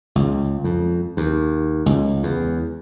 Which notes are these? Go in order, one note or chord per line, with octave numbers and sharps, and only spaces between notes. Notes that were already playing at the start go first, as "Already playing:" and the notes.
C#2
F2
D#2
C#2
E2